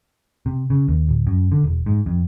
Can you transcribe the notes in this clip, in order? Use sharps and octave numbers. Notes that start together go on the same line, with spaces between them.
C3
C#3
D#2
D1
F#2
D3
E1
G#2
F2